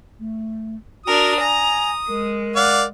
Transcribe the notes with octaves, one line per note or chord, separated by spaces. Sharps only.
A3
D4 F#4 A#4 D#6
G#5 A#5
G#3 A#4
D5 F5 F#5